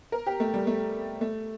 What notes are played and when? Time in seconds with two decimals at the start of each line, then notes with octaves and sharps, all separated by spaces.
0.12 A#4
0.26 G4
0.40 A3
0.54 G3
0.67 A3
1.21 A3